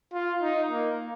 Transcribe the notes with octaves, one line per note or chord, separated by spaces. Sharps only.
F4
D#4
A#3